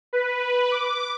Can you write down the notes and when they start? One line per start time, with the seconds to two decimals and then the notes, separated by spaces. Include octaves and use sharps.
0.13 B4
0.71 D6